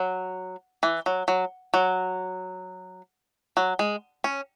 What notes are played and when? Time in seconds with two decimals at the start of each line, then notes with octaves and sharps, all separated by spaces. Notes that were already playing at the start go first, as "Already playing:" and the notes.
Already playing: F#3
0.83 E3
1.06 F#3
1.28 F#3
1.74 F#3
3.57 F#3
3.79 G#3
4.24 C#4